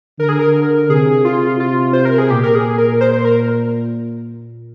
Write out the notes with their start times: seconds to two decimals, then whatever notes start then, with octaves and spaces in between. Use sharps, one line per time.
0.19 D3 A#4
0.29 G#4
0.39 A#4
0.89 C3 G#4
1.25 F4
1.60 F4
1.93 C5
2.05 A#4
2.18 G#4
2.30 A#2 G4
2.44 A#4
2.55 G#4
2.78 A#4
3.01 C5
3.13 C5
3.25 A#4